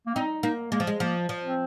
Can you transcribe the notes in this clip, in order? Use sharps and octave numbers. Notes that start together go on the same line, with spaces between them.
A#3
C4 D#4
A#3 D#4
G#3 A#3
F3
G#3
F3 A#3
F3
C4